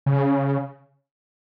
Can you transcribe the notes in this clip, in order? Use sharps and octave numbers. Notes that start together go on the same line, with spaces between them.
C#3